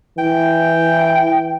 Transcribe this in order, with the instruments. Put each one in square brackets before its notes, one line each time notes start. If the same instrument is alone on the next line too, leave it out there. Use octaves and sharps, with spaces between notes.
[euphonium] E3 [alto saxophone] G5